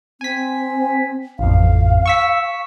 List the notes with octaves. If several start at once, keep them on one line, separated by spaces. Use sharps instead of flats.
C4 G#5 B6
A1 F2 F5
C#6 E6 B6